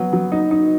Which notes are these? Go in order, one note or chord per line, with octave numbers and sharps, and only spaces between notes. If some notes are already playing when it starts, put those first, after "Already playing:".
Already playing: F#3 B3
F#3
D#4
D#4